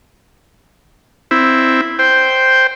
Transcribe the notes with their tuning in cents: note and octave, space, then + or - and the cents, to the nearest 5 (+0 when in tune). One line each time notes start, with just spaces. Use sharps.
C4 +0 E4 +0
C5 +0 G5 +0